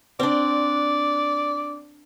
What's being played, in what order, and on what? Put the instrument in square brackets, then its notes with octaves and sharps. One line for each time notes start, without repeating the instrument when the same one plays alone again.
[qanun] C4 D4 [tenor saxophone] D5